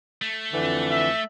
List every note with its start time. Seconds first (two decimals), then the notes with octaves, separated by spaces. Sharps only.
0.22 A3
0.54 F2 D3 E3
0.91 E5